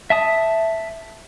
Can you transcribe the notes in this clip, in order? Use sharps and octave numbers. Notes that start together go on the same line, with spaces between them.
E5 A5 D#6